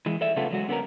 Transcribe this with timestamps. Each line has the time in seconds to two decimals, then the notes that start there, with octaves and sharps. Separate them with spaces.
0.06 E3 G#3
0.21 A4 D5 E5
0.36 C#3 F#3 A3 B3 F4 A4
0.52 F#3 G#3 F#4
0.69 D3 B3 C#4 A#4